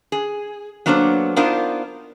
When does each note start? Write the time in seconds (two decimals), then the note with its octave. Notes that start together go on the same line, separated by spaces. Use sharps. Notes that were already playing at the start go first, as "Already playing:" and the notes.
0.12 G#4
0.86 F#3 A#3 B3 D4 A4 C5
1.36 B3 D4 D#4 F4 A#4 C5